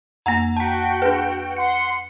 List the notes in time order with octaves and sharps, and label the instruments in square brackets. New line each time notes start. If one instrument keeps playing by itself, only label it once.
[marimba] F2 A#3 [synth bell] F#5 A#5
[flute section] F#4 G5 [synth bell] A5 B6
[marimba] D4 G#4 [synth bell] B4
[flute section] F#5 C6 [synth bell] C#7